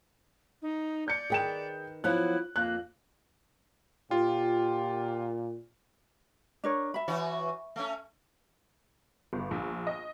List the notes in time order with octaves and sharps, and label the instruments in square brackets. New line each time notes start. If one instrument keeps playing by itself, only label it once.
[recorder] D#4
[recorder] D5 [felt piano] G6 C#7
[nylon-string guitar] D#3 B4 [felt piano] G#4 G5 E7
[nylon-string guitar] F3 F#3 B3 [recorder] E4 [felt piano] F#6
[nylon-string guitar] F2 [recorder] A#3 [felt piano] F#6
[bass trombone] A#2 [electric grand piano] F4 [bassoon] G4
[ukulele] D4 A#4 C#5
E5 B5
[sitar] E3 F#4 C#5
A3 C#4
[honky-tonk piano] G1
A#1
D#5